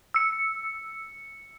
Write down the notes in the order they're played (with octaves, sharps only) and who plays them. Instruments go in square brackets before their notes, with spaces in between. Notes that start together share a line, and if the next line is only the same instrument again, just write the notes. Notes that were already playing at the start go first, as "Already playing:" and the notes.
[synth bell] E6 C#7